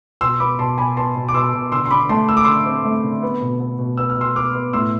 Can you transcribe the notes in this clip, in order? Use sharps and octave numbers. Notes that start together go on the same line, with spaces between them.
B2 C6 E6
B3 B5 D6
B2 A5 C6
B2 G#5 B5
B3 A5 C6
B2
D6
B2 C6 E6
B2
D3 C6 E6
C6
D3 B5 D6
A3 A5 C6
A3 E6
D6
D3 C6 E6
C4
A3
D3
B3
B2
B3
B2
B3 E6
F6
B2 C6 E6
B3 D6 F6
B3
A2 C6 E6